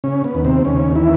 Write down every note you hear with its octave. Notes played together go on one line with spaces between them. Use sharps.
C#3 C#4
B3
D#2
C3 C4
D#2 C#3 C#4
E3 E4